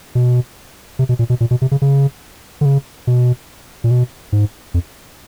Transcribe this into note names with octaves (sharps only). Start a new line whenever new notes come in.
B2
C3
B2
A#2
B2
A#2
B2
C3
C#3
C#3
D3
C#3
B2
A#2
B2
G#2
F2